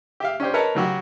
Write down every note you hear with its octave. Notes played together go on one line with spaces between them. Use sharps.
G4 E5 F5
C#4 D4 G4 C5
A#4 B4 C#5 D#5 A5 A#5
C#3 F#3 F#4 G4